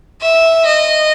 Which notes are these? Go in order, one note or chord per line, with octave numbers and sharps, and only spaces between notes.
E5
D#5